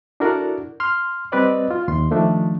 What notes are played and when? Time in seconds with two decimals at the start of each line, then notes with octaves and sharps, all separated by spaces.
0.20 D4 E4 F#4 A4 A#4 D5
0.80 C6 F6
1.32 G3 C4 B4 D5 D#5
1.71 F4
1.88 D#2 C6
2.11 D#3 F3 A3 D4